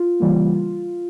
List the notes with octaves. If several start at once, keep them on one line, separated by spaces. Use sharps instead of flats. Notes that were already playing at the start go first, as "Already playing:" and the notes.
Already playing: F4
C#3 E3 G3 A#3